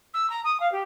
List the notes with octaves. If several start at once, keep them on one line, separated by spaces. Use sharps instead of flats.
E6
A#5
D#6
F5
G4